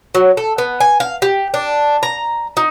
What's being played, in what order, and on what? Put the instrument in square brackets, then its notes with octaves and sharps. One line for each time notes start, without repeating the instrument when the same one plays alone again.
[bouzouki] F#3
A4
B3
G#5
F5
G4
D4
A#5
D#4